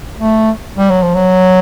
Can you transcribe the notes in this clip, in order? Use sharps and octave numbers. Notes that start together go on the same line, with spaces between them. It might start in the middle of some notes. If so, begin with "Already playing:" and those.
A3
G3
F#3
F3
F#3